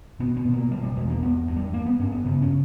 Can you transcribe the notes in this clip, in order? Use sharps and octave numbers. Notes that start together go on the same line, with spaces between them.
B2 B3
B3
B2
A#3
B2 G3
G3
E2 G#3
A#3
G2 B3
G2
G3
G2 A#3
B3
G2 C#4
B3
C#3 B3
C#4